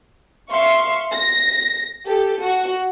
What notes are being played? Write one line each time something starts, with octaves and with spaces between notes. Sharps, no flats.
E5 F5 C6 C#6
A#6
G4 A4
F#4